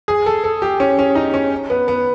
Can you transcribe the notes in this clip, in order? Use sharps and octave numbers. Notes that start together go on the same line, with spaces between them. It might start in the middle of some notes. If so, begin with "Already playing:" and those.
G#4
A4
A4
G4
C#4
C#4
D#4
C#4
B3
B3